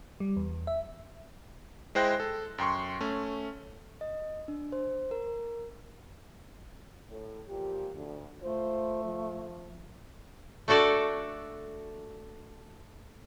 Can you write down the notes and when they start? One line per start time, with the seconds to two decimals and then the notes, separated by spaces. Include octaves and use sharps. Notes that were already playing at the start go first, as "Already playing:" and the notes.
0.20 G3
0.36 E2
0.67 E5
1.95 G#3 E4 C5 G5 F#6 A#6
2.20 A4
2.58 F#2 G5 C6 C#6
3.01 A3 C#4
4.01 D#5
4.48 D4
4.72 C5
5.11 A#4
7.10 A2
7.48 A#2 F3 G4
7.95 D2
8.42 A3 F4 C5
9.04 F3
10.68 A3 D4 F#4 A4 D5